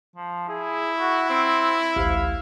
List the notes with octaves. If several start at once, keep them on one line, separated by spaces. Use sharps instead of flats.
F3
E4 G#4
F#4
C4
A1 D2 F5